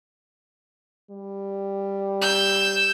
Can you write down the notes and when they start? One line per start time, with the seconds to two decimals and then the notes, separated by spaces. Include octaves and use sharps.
1.11 G3
2.22 E6 G6